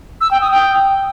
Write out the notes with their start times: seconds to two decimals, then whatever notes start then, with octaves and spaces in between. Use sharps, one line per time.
0.21 E6
0.31 G5
0.41 D#6
0.52 G5